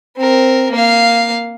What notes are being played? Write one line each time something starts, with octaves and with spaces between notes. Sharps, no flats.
C4 A#4
A#3 F5